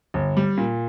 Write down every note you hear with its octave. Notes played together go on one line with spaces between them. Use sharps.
G1
G3
A#2